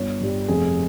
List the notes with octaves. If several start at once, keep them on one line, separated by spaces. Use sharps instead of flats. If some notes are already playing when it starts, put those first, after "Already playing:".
Already playing: G1 C#5
G2 G3
F1 G#4